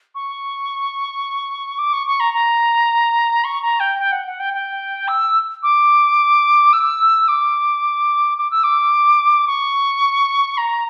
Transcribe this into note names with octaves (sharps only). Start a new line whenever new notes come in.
C#6
D6
C#6
C#6
A#5
A#5
C#6
A#5
G5
G5
F#5
F#5
G5
G5
E6
D6
E6
D6
D6
E6
D6
C#6
A#5